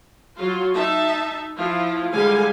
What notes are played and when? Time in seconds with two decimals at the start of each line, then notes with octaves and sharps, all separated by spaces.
0.37 F#3 F4
0.74 D#4 E5 A5
1.57 F3 E4 F4
2.13 D3 G3 G#3 F5 G#5